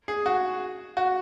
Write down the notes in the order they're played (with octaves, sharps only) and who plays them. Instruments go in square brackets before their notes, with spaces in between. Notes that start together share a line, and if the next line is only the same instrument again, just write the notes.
[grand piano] G#4
F#4
F#4